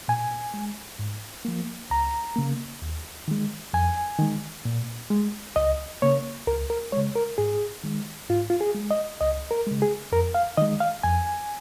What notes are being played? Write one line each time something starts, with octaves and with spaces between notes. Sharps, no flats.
A#2 G#5
G#3
G#2
F3 A#3
C#2 A#5
C#3 A#3
D#2
D#3 G#3
F2 G#5
D#3 G#3
A#2
G#3
C#2 D#5
C#3 A#3 C#5
C#2 A#4
A#4
C#3 G#3 C#5
A#4
G#2 G#4
D#3 G#3
G#2 F4
F4
G#4
G#3
D#5
C#2 D#5
A#4
C#3 G#3
G#4
F2 A#4
F5
D#3 G#3 D#5
F5
F2 G#5